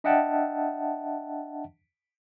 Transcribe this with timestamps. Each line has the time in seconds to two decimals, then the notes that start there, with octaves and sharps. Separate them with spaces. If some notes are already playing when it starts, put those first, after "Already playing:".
0.04 D4 D#5 E5 F#5 G5 A5